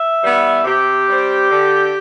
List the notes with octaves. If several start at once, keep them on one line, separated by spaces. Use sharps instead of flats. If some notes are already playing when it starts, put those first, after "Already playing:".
Already playing: E5
E3 G3 B3
C3 G4
G3 C4
D3